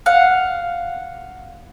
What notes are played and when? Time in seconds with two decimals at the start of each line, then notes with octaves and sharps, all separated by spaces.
0.06 F5 F#5